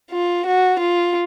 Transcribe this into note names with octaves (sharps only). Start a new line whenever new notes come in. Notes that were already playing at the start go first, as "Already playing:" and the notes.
F4
F#4
F4